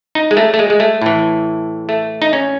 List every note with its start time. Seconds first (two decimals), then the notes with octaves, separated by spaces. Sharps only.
0.15 D#4
0.31 G#3
0.37 A3
0.54 A3
0.59 G#3
0.70 G#3
0.80 A3
1.02 A2 E3
1.89 A3
2.22 D#4
2.33 C#4